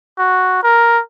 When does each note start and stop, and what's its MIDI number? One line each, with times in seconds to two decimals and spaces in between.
0.19 0.63 66
0.63 1.01 70